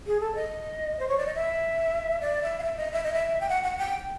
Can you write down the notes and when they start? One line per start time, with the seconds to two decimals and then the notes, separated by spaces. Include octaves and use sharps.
0.07 G#4
0.20 A4
0.35 D#5
0.99 C5
1.08 C#5
1.17 D5
1.26 D#5
1.35 E5
2.21 D5
2.43 E5
2.59 F5
2.63 E5
2.77 D#5
2.93 E5
3.04 D#5
3.13 E5
3.40 G5
3.49 F#5
3.63 F#5
3.78 G5